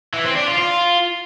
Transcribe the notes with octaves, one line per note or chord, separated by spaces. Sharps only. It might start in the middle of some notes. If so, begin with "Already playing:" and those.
E3
C4
D4
F4
F4